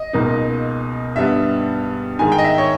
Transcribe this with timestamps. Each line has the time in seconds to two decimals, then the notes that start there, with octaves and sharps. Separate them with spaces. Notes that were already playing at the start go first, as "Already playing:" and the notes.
Already playing: D#5
0.13 C#2 B2 A#3 D#4
1.16 G2 G3 B3 E5
2.19 G#2 D#3 G#3 G#5
2.32 G5
2.38 D#5
2.44 E5
2.58 C#5